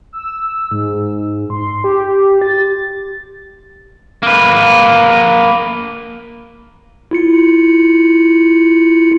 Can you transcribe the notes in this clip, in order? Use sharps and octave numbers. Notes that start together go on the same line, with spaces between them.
E6
G#2
C6
G4
A6
A#3 B4
E4 F4 C#7